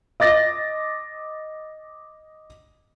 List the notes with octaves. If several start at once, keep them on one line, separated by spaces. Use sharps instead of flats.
D#5 D6 A6 A#6